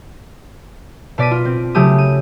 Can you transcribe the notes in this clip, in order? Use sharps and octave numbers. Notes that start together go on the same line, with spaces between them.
B2 D5 B6 D#7
F4
C4
C#3 F#3 A3 G4 D#6
D#7